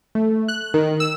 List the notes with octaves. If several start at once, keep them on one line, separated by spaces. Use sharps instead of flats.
A3
F#6
D#3
E6